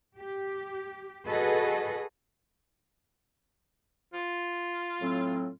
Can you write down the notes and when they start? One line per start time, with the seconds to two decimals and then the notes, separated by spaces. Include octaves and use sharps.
0.17 G4
1.27 F#4 G#4 A4 B4 D#5
4.13 F4
5.01 A2 F#3 C4